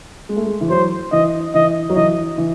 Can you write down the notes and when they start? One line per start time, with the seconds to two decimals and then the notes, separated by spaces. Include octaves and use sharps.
0.29 G#3
0.36 A3
0.46 G#3
0.61 E3
0.70 F#3 C5
1.12 E3 D#5
1.54 E3 D#5
1.90 F#3
1.95 E3 D#5
2.38 E3